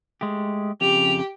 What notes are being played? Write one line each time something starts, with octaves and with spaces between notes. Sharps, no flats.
G#3 A3 G4
F2 C#3 G4 F7